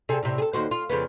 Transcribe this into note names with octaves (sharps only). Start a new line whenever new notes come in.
C3 G#4 A4
A2 C3
G#4 A4
D#2 F#4 C5
F4
F2 C#3 B3